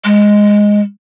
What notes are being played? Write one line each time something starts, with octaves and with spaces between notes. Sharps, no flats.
G#3